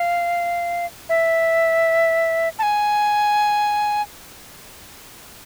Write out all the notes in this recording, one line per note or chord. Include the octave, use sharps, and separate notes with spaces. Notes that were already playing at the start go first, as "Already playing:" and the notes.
Already playing: F5
E5
A5
G#5